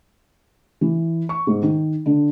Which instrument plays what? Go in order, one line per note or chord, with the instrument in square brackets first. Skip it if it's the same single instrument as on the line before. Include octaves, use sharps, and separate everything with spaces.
[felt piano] E3
C#6
G#2
D#3
D3